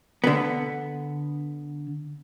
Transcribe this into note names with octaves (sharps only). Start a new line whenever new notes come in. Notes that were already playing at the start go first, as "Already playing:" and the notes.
D3 B3